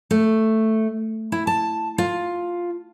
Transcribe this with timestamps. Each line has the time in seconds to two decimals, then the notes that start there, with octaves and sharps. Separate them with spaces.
0.11 A3
1.32 E4
1.47 A5
1.98 F4